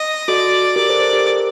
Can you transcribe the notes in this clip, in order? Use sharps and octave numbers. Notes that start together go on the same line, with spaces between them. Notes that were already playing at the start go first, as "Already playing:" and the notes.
Already playing: D#5
F#4 A4 D5
G4 A#4 D5
A4 C5
A4 C5
G4 A#4